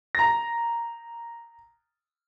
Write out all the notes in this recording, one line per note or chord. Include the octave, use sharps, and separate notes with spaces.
A#5 A#6